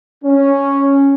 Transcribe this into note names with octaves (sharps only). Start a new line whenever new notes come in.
C#4